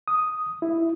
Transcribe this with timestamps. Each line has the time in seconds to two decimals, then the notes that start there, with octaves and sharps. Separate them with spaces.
0.08 D#6
0.62 E4